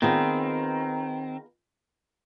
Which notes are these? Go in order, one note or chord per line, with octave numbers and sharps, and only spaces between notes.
D#3 B3 C4 F4 G#4